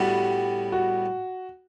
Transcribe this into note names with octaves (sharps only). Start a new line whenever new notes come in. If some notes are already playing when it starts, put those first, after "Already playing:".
Already playing: A2 G3 B3 F#4
F#4